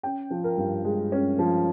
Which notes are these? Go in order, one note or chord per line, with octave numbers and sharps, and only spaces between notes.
C#4 G5
F3
A#4
G2
G#3
C#4
F3